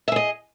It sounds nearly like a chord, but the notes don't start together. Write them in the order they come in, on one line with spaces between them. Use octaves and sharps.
E5 G#4 D#5